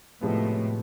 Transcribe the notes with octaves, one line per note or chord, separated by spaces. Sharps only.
A2 C3 F3 G#3 B3